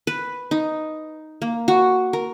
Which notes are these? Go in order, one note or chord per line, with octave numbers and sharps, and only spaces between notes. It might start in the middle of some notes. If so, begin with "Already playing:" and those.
B4
D#4
A#3
F#4
A#4